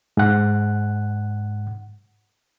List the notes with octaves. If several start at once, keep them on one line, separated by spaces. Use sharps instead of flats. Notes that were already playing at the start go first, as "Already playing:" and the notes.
G#2 F#5